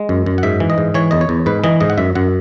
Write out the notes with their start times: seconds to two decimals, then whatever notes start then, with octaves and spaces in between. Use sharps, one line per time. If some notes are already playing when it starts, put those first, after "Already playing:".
Already playing: G#3
0.09 F#2
0.26 F#2
0.38 F#5
0.43 G#2 E5
0.60 E3
0.70 D#5
0.78 G#2
0.94 E3 C#5
1.11 E2 D#5
1.21 C#5
1.29 E2
1.46 G#2 B4
1.64 E3 D#5
1.80 G#2 D#5
1.90 F#5
1.97 F#2 E5
2.15 F#2 F#5